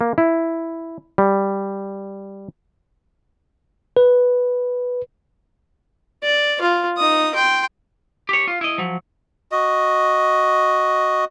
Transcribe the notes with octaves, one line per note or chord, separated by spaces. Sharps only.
A#3
E4
G3
B4
D5
F4
D#4 D#6
G5 C6
G4 C#5
F4
E4 D#5
F3 F#3
F#4 D#5